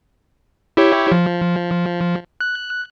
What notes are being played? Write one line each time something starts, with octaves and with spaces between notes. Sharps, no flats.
E4 G4 C#5
F3
F#6